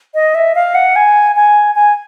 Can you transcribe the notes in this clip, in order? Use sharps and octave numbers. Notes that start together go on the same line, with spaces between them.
D#5
E5
F5
F#5
G#5
G#5
G#5